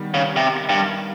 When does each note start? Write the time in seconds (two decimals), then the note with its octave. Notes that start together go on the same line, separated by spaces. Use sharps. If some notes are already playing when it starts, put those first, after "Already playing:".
Already playing: D#3 G3 B3
0.14 C#3
0.36 C3
0.69 G2